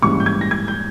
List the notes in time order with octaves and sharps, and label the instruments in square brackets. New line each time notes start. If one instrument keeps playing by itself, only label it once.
[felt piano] A#1 G#2 E3 G3 C#4 [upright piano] C#6
[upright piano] G6
G#6
A#6
G#6
G6